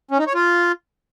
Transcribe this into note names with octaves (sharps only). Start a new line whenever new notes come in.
C#4
D#4
C#5
F4